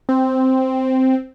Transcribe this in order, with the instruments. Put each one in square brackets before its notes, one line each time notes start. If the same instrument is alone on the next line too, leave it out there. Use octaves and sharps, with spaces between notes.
[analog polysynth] C4